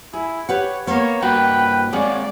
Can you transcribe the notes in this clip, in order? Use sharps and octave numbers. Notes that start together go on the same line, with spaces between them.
E4 G#4
G4 B4 C#5 F#5
A#3 B3 C#5
G2 A#3 F#4 B4 F#5 G5
G#3 A#3 C4 G#4 C#5 D5 F#5